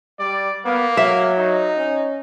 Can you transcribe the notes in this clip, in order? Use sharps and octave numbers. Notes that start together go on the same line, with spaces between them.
G3 D5
A#3 B3
F#3 E5
D#4
C#4